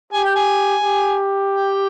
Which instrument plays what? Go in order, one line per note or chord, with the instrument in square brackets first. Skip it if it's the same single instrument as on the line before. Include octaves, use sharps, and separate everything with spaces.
[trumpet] G4 [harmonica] G#5
[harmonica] G5
G#5
[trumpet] G4
[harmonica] G5